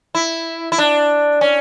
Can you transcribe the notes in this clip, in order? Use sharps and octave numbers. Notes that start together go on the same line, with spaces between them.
E4
E4
D4
C#4